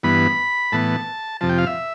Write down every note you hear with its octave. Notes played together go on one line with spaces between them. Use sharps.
G2 E3 B3 B5
A2 E3 B3 A5
F2 C3 F3 A5
G5
F5
E5